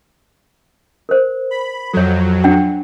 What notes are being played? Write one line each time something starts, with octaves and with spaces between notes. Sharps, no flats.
A#4 C5
B5
F2 F#3 A4 C#5
D4 F#5 G5